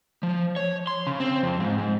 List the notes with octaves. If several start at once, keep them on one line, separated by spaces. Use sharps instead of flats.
F3
C#5
C6
C#3
C4
F2
G#2
G#2